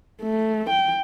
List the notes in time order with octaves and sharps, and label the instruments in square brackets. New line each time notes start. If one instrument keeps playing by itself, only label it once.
[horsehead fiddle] A3
G5